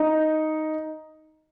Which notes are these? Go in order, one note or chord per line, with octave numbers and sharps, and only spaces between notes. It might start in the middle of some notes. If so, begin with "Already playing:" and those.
Already playing: D#4